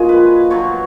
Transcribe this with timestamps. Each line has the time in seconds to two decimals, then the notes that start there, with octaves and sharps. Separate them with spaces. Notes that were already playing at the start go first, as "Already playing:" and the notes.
Already playing: A#2 F3 G#3 D#4 F#4 G#4
0.09 B4
0.50 B2 F#3 C#5